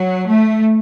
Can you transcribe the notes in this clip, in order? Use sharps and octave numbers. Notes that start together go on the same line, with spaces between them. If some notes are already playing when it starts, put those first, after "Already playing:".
Already playing: F#3
A3